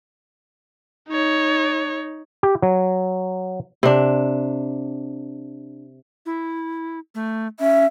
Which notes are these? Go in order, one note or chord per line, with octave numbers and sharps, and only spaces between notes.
D#4 C#5
G4
F#3
C3 D4
E4
A3
C#4 E5